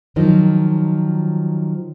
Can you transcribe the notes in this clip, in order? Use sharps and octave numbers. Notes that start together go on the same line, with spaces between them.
D#3 F3 F#3 D#4